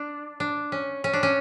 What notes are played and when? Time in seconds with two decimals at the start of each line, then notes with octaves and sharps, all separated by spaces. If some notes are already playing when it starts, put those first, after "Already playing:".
Already playing: D4
0.40 D4
0.72 C#4
1.04 C#4
1.13 D4
1.23 C#4